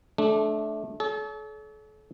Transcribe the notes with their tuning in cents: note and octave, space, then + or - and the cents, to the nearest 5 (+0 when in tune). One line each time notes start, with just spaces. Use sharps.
A3 -25 D4 +0
A4 -40 C#5 +45